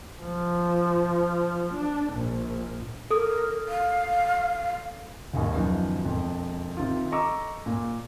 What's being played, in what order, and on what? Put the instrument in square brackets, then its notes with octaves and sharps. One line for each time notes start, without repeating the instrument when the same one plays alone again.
[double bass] F3
D4
A#1
[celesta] A4 D#6 [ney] A#4
[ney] F5
[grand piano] E1 A#1 D#2
F#2 B2 D#3 F3 F#3
E1 F2
C3 D#3 F4
A4 D#5 A#5 C#6 D6 E6
A#2